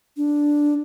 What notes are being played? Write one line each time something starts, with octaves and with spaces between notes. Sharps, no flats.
D4